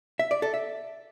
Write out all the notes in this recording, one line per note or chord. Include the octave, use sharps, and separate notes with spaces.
E5
D5
A4
E5